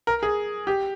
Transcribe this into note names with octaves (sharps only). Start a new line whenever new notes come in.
A#4
G#4
G4